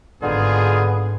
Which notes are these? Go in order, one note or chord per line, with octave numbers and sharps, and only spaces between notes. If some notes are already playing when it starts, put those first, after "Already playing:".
G#1 D3 B3 D#4 F4 G#4